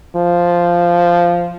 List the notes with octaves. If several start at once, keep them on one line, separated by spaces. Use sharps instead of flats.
F3